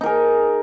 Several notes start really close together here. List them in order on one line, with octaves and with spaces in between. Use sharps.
D#4 A#4 G#4